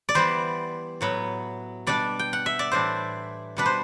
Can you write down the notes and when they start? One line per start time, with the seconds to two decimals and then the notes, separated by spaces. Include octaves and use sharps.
0.09 D5
0.15 E3 G3 B3 C5
1.01 A2 F#3 B3
1.87 B2 G3 D4 D5
2.19 G5
2.33 F#5
2.46 E5
2.59 D5
2.72 A2 E3 G3 D4 C5
3.57 B2 G3 D4 B4
3.66 C5